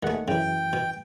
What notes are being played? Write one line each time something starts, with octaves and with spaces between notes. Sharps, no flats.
D#2 D#3 G#3 A3 F#5
F#2 C#3 E3 G5
B2